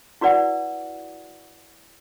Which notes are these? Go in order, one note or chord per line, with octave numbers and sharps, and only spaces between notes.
E4 F#4 B4 D5 F#5